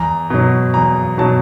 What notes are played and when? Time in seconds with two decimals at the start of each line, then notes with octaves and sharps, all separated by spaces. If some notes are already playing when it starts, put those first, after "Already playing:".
Already playing: E2 A#5
0.30 B2 F#3
0.74 E2 A#5
1.18 B2 F#3 A5